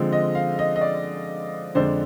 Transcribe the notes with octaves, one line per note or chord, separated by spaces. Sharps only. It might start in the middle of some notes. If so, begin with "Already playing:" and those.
Already playing: D3 F3 G#3 C4
D#5
F5
D#5
D#5
D5
F2 D3 G#3 D4 C5